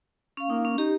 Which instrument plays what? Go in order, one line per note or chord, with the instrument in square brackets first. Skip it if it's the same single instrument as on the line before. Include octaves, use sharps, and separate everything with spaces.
[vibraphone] C#4 F5
[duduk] A#3 [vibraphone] D#4
[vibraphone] C#4
[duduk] D#4 [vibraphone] G4